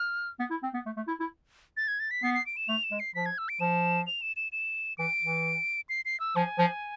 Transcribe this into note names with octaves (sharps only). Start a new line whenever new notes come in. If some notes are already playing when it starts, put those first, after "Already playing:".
Already playing: F6
B3
E4
C4
B3
A3
A3
E4
E4
A6
G#6
A6
B6
B3 C7
C7
D7
E7
A3 F7
E7
G#3
C7
F3 B6
G#6
E6
D7
F3 E7
F7
E7
E7
E7
E3 D7
E3
C7
C7
E6
F3 G#5
F3